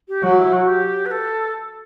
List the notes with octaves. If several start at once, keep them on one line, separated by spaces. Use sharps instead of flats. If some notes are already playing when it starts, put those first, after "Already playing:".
G4
F#3 F#4
E4
F#4
G4
B4
A4